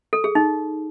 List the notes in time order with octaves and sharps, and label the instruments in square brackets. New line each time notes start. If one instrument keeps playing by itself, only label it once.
[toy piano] A4
G#4
D#4